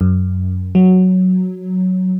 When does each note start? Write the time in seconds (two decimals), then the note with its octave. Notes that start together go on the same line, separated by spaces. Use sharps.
0.01 F#2
0.75 F#3